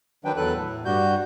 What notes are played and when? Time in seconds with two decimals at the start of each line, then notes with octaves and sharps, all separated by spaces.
0.25 D#3 F#3 D4 B4 G5
0.37 E2 F#3 A4 B4 F#6
0.55 A2
0.85 G2 G3 F#4 G6